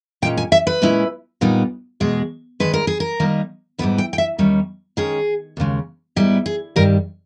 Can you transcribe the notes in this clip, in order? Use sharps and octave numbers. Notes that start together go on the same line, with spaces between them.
A#2 G#3 C#4 G5
G#5
E5
B4
A#2 G#3 C#4 E4
A#2 G3 B3 D#4
E2 B2 G#3 G#4
G2 D#3 G#3 B4
A#4
G#4
A#4
D#3 G3 A#3 D#4
G#2 G3 B3 E4 B4
G5
G5
E5
D#2 D#3 G3 C#4
D#3 G#3 C#4 G#4
D#2 C#3 G#3
G#2 G3 B3 E4 G4
G#4
G2 D#3 G3 A#4